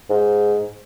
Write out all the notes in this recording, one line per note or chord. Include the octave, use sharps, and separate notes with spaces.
G#2